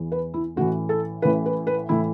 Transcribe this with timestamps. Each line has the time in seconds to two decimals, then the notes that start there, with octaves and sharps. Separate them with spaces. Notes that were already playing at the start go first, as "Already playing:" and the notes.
Already playing: E2 E3
0.12 B4
0.34 E4
0.56 A1 A2 E3 F#4
0.89 A4
1.22 A1 A2 E3 B4
1.46 B4
1.67 B4
1.89 A2 E3 E4